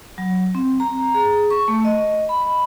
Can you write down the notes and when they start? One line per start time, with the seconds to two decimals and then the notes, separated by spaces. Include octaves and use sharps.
0.18 F#3
0.55 C4
0.80 A#5
1.14 G#4
1.50 C#6
1.68 A3
1.85 D#5
2.29 B5